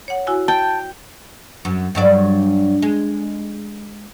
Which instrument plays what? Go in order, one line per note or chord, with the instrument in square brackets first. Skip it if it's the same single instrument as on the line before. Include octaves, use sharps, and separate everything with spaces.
[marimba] C#5 F#5
E4 F#4 G#5
[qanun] G5 [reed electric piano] A5
[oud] F#2
G2 F#3 D5
G#3